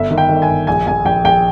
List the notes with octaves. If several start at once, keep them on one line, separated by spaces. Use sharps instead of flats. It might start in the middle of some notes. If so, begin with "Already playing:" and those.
Already playing: G1 E5
D#3
G5
D#3
G#5
G1
A#1 G#5
A#1 G#5
A#1 G5
A#1 G5